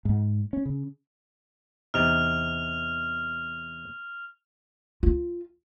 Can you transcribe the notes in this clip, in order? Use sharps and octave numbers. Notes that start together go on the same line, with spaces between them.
G#2
C#4
C#3
E2 C3 D#4 F6 F7
F4